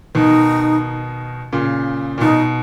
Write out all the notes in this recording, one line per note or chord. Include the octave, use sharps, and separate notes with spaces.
B2 D#3 D#4
A#2 C#3
A#2
B2 D#4